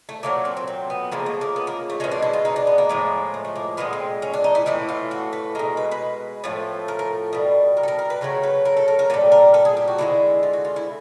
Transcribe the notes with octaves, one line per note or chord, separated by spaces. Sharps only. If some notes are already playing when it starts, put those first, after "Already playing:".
A3
A#2 F#3 A3 A#3
C4
C4
C4
B3
C#3 F3 G#3 A#3
A3
A#3
B3
A#3
A3
B2 G#3 C#4
D4
E4
F4
D#4
D4
B3
A#3
A2 F3 G#3
A3
A3
A#3
A#2 F3 G#3 B3
C4
C#4
D4
D#4
E4
A2 E3 A3 E4
F4
F#4
B4
B2 G#3 A#4
B4
B4
A2 F3 A3
A#4
A#4
B2 G3
A#4
A4
A#4
A#4
B4
C#3 F#3 A3 A#4
B4
A#4
A4
A#4
A#4
A#2 G3 A4
A#4
A4
G#4
G4
F#4
D3 F3 G#3 E4
F4
F#4
F4
E4